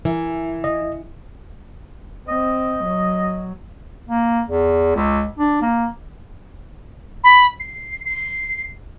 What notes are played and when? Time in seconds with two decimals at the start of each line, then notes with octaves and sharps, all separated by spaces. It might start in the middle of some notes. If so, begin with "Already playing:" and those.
0.05 E3 A#4
0.64 D#5
2.29 C4 D#5
2.84 F#3
4.09 A#3
4.48 E2
4.95 C#2
5.39 D4
5.62 A#3
7.24 B5
7.60 C7
8.06 C7